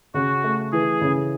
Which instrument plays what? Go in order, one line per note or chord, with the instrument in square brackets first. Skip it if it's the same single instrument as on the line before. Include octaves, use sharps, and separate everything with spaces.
[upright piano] C#3 [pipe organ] F#4
[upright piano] A3
[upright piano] E3 [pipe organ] G#4
[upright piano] C#3